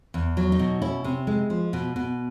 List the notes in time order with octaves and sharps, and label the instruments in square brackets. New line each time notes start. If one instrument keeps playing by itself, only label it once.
[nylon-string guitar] E2
F#3
D#4
B2
C#4 E4
C3
G#3
F3
B2
B2